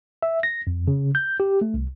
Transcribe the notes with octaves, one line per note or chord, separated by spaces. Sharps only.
E5
A#6
F2
C#3
G6
G4
A3
C2